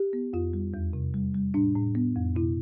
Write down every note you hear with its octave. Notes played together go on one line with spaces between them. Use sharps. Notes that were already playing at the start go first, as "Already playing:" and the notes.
Already playing: G4
B3
F2 F4
G3
E2
C3
G3
G3
A2 D4
A2
B3
F2
B2 E4